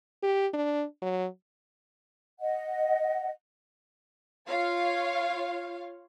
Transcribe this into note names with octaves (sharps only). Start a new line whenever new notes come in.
G4
D4
F#3
D#5 F#5
F4 C#5 F5